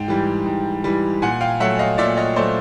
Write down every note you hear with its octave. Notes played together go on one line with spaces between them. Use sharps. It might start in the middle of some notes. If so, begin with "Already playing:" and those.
Already playing: G#2 G5
E3 G3
G#2
E3 G3
A#2 F#5 G#5
F5 G5
F#3 A3 E5 F#5
D#5 F5
A#2 D5 E5
C#5 D#5
F#3 A3 C5 D5